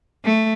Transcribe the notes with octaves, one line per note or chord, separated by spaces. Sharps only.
A3